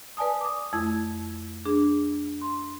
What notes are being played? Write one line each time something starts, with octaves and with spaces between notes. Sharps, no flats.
B4 D5 G#5 A5 D#6
D6 D#6
F2 A3 E4 G#6
D4 G#4
C6